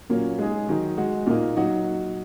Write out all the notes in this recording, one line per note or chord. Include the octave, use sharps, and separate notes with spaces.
A#2 F#3 A#3 C#4
G#3 D#4 G#4
D#3 F#3 D#4
G#3 F#4
A#2 A#3 D#4
F#3 D#4 F#4